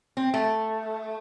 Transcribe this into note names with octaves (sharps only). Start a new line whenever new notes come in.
C4
A3